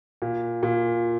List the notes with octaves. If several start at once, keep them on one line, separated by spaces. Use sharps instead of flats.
A#2
A#2